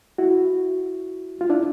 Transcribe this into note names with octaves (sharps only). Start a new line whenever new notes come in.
E4 F#4
F4
D4 E4